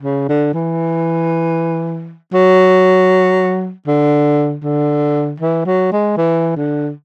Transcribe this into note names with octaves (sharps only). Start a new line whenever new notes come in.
C#3
D3
E3
F#3
D3
D3
E3
F#3
G#3
E3
D3